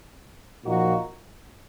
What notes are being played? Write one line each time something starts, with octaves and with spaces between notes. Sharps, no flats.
A#2 F3 A#3 D#4 F#4